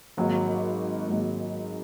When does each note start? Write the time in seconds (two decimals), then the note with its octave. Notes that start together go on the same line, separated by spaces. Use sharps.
0.17 G#1 G#2 F#3 A#3
1.09 G#1 G#2 F#3 A#3